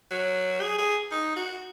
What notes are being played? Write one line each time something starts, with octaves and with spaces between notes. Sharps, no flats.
F#3
G#4
G#4
D#4
F#4